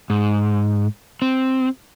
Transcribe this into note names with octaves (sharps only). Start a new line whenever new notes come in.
G#2
C4